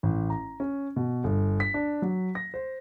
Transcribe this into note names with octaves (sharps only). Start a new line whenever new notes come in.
A1
A#5
C#4
B2
G1
B6
D4
F#3
A#6
C5